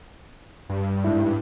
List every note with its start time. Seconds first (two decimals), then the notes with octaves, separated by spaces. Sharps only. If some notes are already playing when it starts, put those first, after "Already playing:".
0.70 G2
1.04 G#2 E4